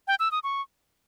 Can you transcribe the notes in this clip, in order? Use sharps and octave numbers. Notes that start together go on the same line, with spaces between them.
G5
E6
D#6
C#6